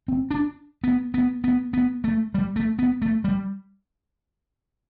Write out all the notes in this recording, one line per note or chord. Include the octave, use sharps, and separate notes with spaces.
C4
D4
B3
B3
B3
B3
A3
G3
A3
B3
A3
G3